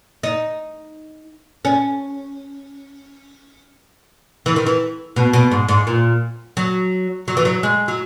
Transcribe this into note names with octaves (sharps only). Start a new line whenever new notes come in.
D#4
C#4
E3
D#3
E3
B2
B2
G#2
G#2
A#2
F#3
F#3
E3
F#3
G#3
F#3